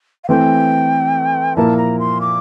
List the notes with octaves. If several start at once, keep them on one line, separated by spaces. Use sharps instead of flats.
F5
E3 A3 C4 G5
A#2 F3 A#3 E4 A#4 A5
A#5
C6
D6